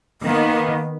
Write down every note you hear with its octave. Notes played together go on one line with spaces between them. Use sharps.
D#3 A#3 B3